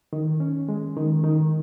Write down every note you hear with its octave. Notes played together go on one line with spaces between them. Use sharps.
D#3
C#4
G#3
D#3
D#3